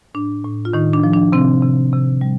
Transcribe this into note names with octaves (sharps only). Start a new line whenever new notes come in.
A2 D4
A2
F4
A2 D#3 D#4
D4
F3
D4
C3 C4
C3
C3
G3